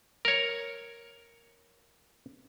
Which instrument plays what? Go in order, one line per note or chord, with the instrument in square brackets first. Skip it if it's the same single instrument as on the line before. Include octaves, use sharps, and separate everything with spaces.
[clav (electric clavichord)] A#4 C#5